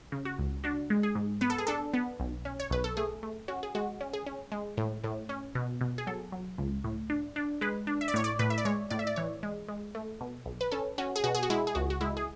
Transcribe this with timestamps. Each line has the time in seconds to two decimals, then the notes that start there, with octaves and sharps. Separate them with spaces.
0.12 C#3
0.25 F#4
0.38 C#2
0.64 D4 F#4
0.90 G#3
1.03 G#4
1.15 G#2
1.41 B3 B4
1.50 A4
1.58 G#4
1.67 D4 A4
1.94 B3
2.20 B1
2.45 C#4
2.60 C#5
2.70 B1 B4
2.84 A4
2.97 A3 G#4
3.23 A3
3.48 C#4 F#4
3.63 G#4
3.75 G#3 F#4
4.01 C#4
4.13 G#4
4.26 C#4
4.52 G#3
4.77 A2
5.04 A2
5.29 C#4
5.55 B2
5.81 B2
5.98 G#4
6.07 F#3 A4
6.32 F#3
6.58 C#2
6.84 A2
7.10 D4
7.36 D4
7.61 G#3 B4
7.87 D4
8.01 E5
8.08 D5
8.14 A2 C#5
8.24 D5
8.39 A2 B4
8.50 E5
8.58 D5
8.65 G#3 C#5
8.90 A2 D5
8.99 E5
9.07 D5
9.16 E3 C#5
9.43 G#3
9.68 G#3
9.95 A3
10.21 B2
10.46 B1
10.61 B4
10.71 C#4 A4
10.98 C#4 F#4
11.16 G#4
11.24 B2 F#4
11.35 G#4
11.43 F#4
11.50 G#3 E4
11.67 G#4
11.75 C#2 F#4
11.90 F#4
12.01 G#3 E4
12.17 G#4